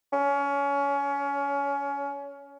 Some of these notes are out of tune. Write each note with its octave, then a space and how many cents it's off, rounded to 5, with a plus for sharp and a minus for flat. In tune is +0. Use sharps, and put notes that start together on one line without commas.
C#4 +25